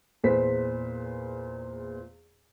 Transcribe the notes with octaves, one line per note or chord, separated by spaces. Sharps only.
E2 A#2 G#4 B4 C5 B6